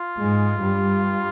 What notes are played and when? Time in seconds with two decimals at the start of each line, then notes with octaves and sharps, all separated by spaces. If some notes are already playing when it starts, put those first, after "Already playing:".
Already playing: F4
0.18 G#2 G#3
0.60 G2 G3